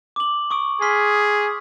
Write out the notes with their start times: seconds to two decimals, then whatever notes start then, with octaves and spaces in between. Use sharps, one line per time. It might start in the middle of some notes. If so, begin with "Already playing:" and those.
0.16 D6 F#7
0.51 C#6 D#6 D7
0.82 G#4 C6 F6 B6